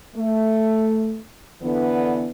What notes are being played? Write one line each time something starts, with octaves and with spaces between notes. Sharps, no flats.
A3
D3 E3 B3